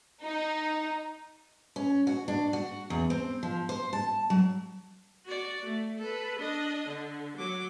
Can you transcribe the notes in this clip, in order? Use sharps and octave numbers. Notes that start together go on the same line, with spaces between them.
D#4
C#4
F#4
D4
F#4
E2
C4
F3
C5
A5
F#3
F#4 D5
A3
A4 B4
D4 D#5
D3
F#3 D6